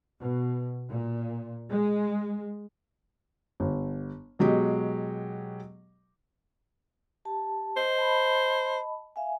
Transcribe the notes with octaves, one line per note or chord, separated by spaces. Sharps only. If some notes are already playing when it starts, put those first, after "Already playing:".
B2
A#2
G#3
G1
B2 F#3 G#3 G4
G4 A5
C5 D#5
D#5 A5 B5
E5 F5 G#5